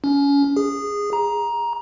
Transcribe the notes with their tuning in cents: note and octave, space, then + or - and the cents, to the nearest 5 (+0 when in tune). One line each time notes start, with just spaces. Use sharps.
C#4 +30
G#4 -15
A#5 +15